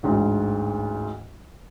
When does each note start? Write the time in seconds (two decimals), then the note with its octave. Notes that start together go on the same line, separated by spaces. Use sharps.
0.03 A1 D2 G#2